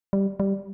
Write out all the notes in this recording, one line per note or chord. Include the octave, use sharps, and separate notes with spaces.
G3
G3